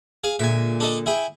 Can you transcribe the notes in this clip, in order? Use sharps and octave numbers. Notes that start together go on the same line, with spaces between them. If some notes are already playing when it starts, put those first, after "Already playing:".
G#4 F5
A#2 D3 G#3 E5 G#5
D4 A4 D#5
E4 G#4 G5